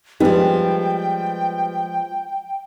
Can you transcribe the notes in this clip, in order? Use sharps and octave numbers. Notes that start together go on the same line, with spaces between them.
F3 G3 G#3 B3 G5